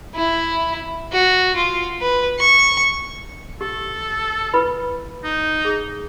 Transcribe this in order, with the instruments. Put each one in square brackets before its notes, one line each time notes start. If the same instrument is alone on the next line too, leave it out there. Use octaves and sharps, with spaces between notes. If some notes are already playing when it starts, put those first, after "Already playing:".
[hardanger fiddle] E4
F#4
F4
B4
C#6
[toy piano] G4 [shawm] A4
[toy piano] E4 B4 B5
[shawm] D#4
[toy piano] G#4